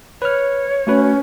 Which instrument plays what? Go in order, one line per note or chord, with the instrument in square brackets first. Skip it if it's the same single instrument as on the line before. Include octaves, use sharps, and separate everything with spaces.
[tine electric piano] B4 F6 [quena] C#5
[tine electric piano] A3 F#4 B4 [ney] C#4